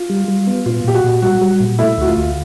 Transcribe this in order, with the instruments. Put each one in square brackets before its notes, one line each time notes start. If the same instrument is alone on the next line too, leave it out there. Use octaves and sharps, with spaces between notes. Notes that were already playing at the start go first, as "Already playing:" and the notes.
Already playing: [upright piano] F4
[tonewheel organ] G3
G3
B3
[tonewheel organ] A#2 [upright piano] F4
[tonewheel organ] A#2 [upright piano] G4
[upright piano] F#4
[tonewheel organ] A#2
[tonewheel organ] G3 [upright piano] F#4
[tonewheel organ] G3
A#2
[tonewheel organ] A3 [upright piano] E4
[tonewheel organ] D2 [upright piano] F#4
[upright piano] F4
[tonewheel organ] D2